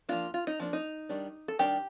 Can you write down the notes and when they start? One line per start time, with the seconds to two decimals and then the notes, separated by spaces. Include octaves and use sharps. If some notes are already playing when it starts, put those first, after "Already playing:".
0.09 F3 A#3 D4 F4
0.34 F4
0.47 D#4
0.60 F3 A#3 D4
0.73 D#4
1.09 D#3 G3 D4
1.48 A4
1.59 D#3 G3 D4 G4